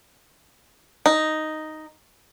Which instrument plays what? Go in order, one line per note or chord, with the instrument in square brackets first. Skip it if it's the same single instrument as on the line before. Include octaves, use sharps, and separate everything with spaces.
[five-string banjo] D#4